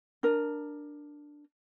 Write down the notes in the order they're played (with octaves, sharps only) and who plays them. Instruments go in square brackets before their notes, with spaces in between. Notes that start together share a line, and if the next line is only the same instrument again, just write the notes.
[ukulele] D4 A#4